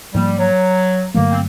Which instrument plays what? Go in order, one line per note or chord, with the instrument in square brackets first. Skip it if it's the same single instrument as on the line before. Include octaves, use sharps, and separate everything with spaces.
[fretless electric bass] G#2 F3 A#3 [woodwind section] G3
[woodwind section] F#3
[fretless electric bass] G2 D3 F#3 A3 [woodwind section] A#3
[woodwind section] C4